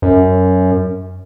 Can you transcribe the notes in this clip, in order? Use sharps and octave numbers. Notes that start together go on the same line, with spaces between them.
F#2